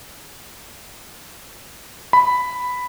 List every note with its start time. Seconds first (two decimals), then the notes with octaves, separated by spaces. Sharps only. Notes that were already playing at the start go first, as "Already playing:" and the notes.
2.13 B5